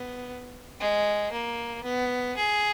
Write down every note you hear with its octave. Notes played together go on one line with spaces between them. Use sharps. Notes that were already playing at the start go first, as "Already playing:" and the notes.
Already playing: B3
G#3
A#3
B3
G#4